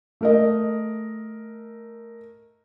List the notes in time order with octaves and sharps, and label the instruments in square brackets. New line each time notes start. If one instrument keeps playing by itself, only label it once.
[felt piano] A3 A#4 D#5